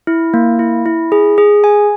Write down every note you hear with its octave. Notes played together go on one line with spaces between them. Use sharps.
E4
A#3
E4
E4
G#4
G#4
G#5